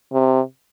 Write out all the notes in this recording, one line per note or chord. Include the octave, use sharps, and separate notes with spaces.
C3